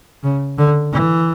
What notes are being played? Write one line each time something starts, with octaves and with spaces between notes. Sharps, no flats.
C#3
D3
E3